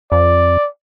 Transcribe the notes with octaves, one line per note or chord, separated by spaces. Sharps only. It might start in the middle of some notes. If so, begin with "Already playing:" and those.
F2 D5